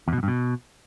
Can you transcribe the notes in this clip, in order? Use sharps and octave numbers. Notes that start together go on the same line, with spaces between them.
E2
B2
F#2
G2
B2